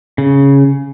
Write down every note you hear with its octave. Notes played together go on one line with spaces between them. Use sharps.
C#3